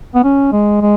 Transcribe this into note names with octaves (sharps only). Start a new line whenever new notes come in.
B3
C#4
G#3
G#3